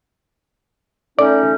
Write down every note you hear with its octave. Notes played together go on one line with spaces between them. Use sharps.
A3 C#4 D#4 D5